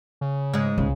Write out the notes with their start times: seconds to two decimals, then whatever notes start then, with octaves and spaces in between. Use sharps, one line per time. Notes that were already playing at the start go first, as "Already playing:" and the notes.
0.21 C#3
0.54 G#2 G#3
0.78 C#2 C#3